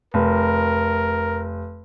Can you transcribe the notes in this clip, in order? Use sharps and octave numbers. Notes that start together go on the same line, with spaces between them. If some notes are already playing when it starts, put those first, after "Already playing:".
F1 A#4